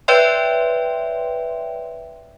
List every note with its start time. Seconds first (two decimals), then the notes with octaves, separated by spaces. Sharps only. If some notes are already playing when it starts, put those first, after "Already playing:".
0.08 B4 C#5 D5 E5 G5 C6